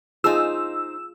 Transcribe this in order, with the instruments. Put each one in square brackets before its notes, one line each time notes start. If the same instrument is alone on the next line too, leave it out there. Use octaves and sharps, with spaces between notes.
[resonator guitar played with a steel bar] D#4 C5 [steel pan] F4 G#4 A5 [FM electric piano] E6